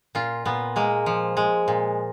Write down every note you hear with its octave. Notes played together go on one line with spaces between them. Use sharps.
A#2 F4
A#2 B3
G#3 A#3
F3
G#3
A#2